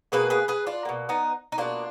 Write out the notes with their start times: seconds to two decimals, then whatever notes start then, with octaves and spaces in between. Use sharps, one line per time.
0.12 B2 A#3 G#4 B4
0.30 G#4 B4
0.48 G#4 B4
0.67 D4 F4
0.85 B2 A#3
1.09 B3 D#4
1.52 D#4
1.58 B2 A#3 D4 F4